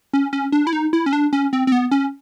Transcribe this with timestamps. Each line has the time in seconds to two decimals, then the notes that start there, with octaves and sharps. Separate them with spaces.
0.13 C#4
0.33 C#4
0.52 D4
0.67 E4
0.73 D#4
0.93 E4
1.06 C#4
1.13 D4
1.33 C#4
1.53 C4
1.67 C4
1.72 B3
1.91 C#4